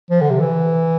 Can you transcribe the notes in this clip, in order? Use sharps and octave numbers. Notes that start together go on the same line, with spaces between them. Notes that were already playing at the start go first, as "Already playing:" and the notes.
F3
D3
C3
E3